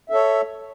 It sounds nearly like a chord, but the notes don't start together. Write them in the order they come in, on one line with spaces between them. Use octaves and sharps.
E5 A4 C#5